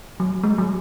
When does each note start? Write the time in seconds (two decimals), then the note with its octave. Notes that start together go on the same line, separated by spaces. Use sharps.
0.20 F#3
0.43 G#3
0.58 F#3